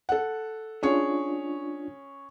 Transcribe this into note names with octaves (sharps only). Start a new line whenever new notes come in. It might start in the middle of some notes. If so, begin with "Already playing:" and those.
A4 F#5
C#4 D4 F4 G#4 C#5